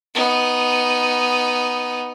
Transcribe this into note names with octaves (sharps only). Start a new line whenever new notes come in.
B3 D#4